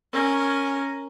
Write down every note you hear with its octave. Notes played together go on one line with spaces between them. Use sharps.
C#4 A#4